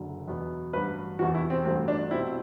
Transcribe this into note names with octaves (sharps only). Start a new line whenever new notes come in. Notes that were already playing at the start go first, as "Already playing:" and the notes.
Already playing: F#1 F#2 D3
E2 B2 F#3 B3
A1 G2 F#3 B4
E1 E2 C3 E3 F#4
E4
C4
A1 G2 F#3 A3 C4
D4
C2 B2 G3 C4 E4